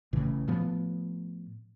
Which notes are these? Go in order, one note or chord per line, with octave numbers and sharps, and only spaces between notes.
A1 A2 C#3 E3
A2 F3 B3